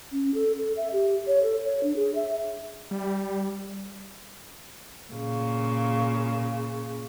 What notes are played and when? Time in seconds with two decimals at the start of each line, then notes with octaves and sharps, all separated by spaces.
0.12 C#4
0.34 A4
0.58 A4
0.77 E5
0.93 G4
1.27 C#5
1.43 A4
1.64 C#5
1.83 D4
1.96 G#4
2.15 E5
2.91 G3
5.13 A#2 C#3